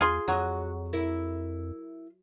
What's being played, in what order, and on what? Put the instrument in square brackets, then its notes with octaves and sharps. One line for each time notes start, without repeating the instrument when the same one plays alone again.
[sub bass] E2 [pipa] F4 C6 [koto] G#4
[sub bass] F2 [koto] F#3 [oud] F#4 D#5
[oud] E4 A#4